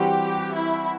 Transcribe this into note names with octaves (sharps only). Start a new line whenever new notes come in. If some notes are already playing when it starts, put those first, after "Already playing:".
Already playing: E3 G3 C4 F#4 G4
E4